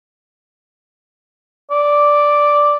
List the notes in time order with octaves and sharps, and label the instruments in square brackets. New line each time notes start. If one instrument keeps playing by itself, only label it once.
[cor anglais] D5